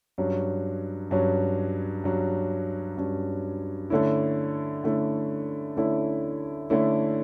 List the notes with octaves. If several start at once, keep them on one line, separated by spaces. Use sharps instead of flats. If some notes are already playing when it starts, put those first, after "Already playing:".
G2 F#3 C#4
G2 F#3 C#4
G2 F#3 C#4
G2 F#3 C#4
D3 A3 C#4 E4
D3 A3 C#4 E4
D3 A3 C#4 E4
D3 A3 C#4 E4